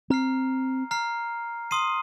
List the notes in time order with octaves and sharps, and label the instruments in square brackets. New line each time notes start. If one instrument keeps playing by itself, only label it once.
[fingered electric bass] C4 [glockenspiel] A#5 F6 C7
[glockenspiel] A#5 F6 C7
C6 D#6 C7 D#7